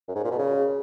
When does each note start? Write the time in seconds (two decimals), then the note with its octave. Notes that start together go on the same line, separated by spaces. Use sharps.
0.08 F#2
0.15 G#2
0.24 A#2
0.31 B2
0.39 C#3